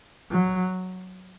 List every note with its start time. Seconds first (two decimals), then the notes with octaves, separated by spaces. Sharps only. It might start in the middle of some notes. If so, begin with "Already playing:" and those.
0.31 F#3